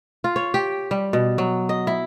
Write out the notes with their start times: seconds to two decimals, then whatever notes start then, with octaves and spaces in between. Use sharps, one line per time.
0.24 F4
0.36 C#5
0.54 G4
0.91 G3
1.13 B2
1.38 F#3
1.69 D#5
1.87 E4